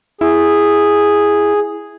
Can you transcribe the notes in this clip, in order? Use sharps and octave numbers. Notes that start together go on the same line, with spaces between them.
E4 G#4